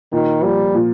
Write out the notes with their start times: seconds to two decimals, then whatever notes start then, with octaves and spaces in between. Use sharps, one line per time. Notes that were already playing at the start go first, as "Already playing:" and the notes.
0.12 A#2 D#3
0.43 F3 G3 A#3
0.75 A#2